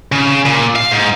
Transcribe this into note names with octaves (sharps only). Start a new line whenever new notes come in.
C#3
A#2
F5
G#2